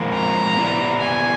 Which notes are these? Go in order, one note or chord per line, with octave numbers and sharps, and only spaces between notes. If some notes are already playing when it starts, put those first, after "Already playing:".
Already playing: F3 G#3 C4 F4 A#4
A#5
B3 E4 G4 B4 D5
G#5